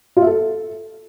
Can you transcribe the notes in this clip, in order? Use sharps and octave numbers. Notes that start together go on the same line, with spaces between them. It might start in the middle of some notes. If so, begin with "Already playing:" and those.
F4
E5
A4